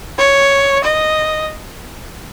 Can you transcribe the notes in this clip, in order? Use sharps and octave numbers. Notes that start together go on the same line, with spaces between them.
C#5
D#5